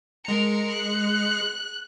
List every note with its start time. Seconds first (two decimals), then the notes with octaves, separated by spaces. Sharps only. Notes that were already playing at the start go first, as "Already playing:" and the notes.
0.25 G#3 A#4 A#5 C#7
0.70 F#6